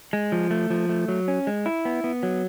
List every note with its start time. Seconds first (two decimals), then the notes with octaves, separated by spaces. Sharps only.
0.13 G#3
0.32 F3
0.51 A3
0.70 F3
0.89 A3
1.08 F#3
1.28 C#4
1.47 G#3
1.66 E4
1.85 B3
2.04 B3
2.23 F#3